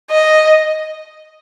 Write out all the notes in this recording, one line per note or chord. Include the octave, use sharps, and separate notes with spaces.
D#5